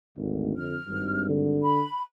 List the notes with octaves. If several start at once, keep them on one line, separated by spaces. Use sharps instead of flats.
G#1 D2
F2 D3 F6
G#1 G2
D3
B5